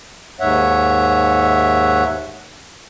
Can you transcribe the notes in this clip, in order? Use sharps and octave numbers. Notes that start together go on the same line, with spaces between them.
D#2 G#2 C#5 E5 F#5